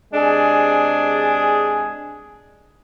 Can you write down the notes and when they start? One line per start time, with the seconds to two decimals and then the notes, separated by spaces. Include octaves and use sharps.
0.13 C3 G#3 D4 G#4